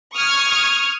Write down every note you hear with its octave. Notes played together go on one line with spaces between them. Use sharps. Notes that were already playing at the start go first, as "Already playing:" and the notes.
C#6 D#6 F6 G#6